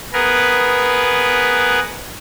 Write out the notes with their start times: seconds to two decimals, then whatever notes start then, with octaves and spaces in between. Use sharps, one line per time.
0.13 B3 G#4 A#4 B4